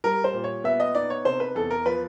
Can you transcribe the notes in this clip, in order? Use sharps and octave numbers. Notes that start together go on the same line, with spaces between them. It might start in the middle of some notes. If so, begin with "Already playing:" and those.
G3 A#4
C5
A#2
C#5
B3 E5
D#5
D#4 D5
C#5
C3 C5
B4
E2 A4
A#4
F3 B4